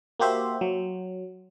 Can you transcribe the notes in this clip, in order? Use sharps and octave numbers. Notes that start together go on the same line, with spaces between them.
A#3 F#4 G4 C5 E5
F#3